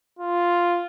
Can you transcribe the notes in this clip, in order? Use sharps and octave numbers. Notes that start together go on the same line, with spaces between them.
F4